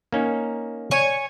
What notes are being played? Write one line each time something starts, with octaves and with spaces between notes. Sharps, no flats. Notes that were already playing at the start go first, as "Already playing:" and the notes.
A#3 C#4 D#4
C#5 G#5